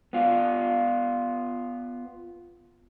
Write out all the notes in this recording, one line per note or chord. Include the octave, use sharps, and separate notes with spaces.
B3 F4